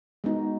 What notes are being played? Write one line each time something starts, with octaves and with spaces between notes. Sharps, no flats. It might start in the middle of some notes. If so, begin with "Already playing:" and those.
G#3 B3 D#4 F#4